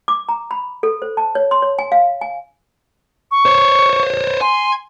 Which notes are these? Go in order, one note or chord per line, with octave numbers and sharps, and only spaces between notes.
D6
A#5
B5
A4
C5
A5
C#5
C6
C#5
G#5
F5
G#5
C#6
C5 C#5
G#5 C6